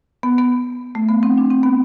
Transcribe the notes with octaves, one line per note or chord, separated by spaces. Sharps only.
B3
B3
A3
B3
C4
D4
C4
B3